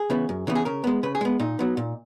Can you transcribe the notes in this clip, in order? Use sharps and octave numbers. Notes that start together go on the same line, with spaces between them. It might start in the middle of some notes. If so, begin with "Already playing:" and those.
Already playing: G#4
C#3 E3 B3
F#2
C#3 E3 B3
G#4
C#3 A#4
G#3 B3
C#3 B4
G#4
G#3 B3
A#2 D#4
F#3 B3
A#2